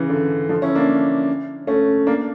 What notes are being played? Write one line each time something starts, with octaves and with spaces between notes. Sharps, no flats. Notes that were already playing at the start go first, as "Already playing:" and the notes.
Already playing: C#3 E3
D3
D3 F3
C#4 E4
A#3 D4
A3 C#4
A#3 D4